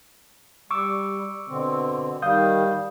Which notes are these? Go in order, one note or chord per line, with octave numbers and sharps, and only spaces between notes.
G3 C#6 D6 E6
B2 D3 C4
D#3 G3 F5 D#6 G6